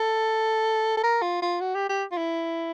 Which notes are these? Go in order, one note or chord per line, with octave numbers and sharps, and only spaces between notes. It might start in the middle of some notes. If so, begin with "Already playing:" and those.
Already playing: A4
A4
A#4
F4
F4
F#4
G4
G4
F4
E4